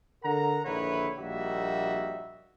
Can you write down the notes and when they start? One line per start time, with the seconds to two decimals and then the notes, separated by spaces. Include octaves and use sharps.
0.24 D3 A#4 F#5 A#5
0.65 A#1 D3 D#3 E4 B4 C#5
1.19 A#1 G3 A#3 D#4 F#4 E5